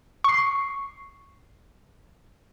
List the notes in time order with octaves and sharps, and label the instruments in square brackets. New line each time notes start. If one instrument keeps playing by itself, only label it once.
[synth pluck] C#6 C7